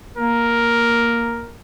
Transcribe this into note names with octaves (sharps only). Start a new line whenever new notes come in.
A#3 A#4